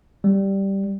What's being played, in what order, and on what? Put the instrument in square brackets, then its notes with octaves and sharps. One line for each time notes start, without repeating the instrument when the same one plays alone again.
[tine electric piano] G3